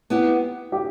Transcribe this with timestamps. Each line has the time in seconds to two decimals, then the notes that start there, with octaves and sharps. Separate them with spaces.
0.10 B3 E4 G4
0.72 G4